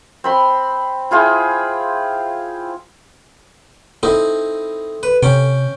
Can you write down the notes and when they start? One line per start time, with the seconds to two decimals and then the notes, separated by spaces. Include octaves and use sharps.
0.24 C4 B5 C6
1.11 E4 F4 G#4 G5
4.03 C4 D#4 E4 A4
5.03 B4
5.23 C3 C#4 G5